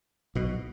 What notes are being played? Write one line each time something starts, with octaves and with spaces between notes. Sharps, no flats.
B1 B2